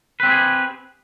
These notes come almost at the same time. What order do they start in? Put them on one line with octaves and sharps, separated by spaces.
B4 C4 G4 G#4